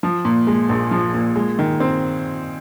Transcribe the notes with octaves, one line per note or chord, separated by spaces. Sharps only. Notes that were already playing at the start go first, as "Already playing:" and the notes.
F3
A#2
G#3
A#1
F3
A#2
G#3
D#3
C4